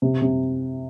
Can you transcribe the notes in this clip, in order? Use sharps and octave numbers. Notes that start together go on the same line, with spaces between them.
C3
C3